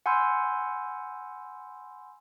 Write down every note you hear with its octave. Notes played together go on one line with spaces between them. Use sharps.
F#5 G#5 B5 C6 E6 G6